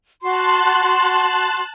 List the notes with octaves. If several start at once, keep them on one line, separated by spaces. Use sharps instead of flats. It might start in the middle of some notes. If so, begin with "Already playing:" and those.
F#4 A5 C6 F#6